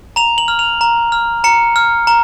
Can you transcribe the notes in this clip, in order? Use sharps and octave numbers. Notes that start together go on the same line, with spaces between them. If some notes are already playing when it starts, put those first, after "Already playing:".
A#5 F7
F#7
F6
F7
A#5
F6
A#5 C#7
F6
A#5